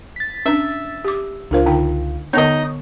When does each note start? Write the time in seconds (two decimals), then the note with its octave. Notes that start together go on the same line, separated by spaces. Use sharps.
0.16 A6 B6
0.46 C#4 D4 E5
1.05 G4 D6
1.51 C#2 D4 F4 A#4 C5
1.66 D3 D#4 G5
2.33 D3 B3 D#4 C#5 D#5